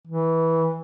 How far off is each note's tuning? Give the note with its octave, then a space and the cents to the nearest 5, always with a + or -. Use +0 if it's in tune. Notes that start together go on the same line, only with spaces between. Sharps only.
E3 -15